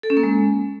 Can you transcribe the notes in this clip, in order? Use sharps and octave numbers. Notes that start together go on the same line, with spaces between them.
A4
C#4
A#3
G#3